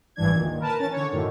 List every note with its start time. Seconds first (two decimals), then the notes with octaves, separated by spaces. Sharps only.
0.16 G#1 G2 E3 D4 G#6
0.33 D2 A#2 D#3
0.60 A#4 B4 A5
0.78 E3 C#4 A6
0.92 D3 C#5
1.11 F#2 A2 D3 D#3